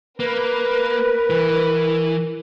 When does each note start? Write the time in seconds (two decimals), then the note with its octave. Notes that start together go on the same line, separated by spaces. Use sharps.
0.20 A#3 A#4 B4
1.30 E3